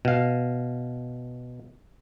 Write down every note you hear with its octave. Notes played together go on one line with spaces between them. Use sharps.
B2 F5